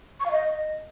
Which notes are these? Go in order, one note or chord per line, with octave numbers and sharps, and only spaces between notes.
C#6
F5
D#5